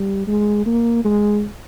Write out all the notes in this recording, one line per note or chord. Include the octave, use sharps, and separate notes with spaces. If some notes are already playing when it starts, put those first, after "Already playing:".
Already playing: G3
G#3
A#3
G#3